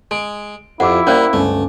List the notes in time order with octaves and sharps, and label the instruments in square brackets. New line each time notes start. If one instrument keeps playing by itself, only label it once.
[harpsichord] G#3 [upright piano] D7
[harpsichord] F2 [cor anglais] E4 [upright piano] F4 G4 D6 [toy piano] F#5
[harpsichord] G3 A#3 [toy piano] C#4 C5 D5 [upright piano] F5
[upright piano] G1 C#2 G#5 [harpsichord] A3